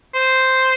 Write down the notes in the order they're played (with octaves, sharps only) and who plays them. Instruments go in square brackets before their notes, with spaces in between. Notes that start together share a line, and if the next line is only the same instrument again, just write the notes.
[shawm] C5